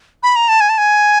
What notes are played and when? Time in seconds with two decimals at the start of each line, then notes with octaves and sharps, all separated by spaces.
0.23 B5
0.36 A#5
0.48 A5
0.61 G#5
0.69 A5
0.78 G#5